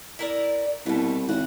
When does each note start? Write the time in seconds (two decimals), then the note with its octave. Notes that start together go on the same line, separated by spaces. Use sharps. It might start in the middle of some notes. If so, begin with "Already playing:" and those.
0.19 E4 A#4 D5
0.86 C2 B2 A3
1.29 G#1 F#4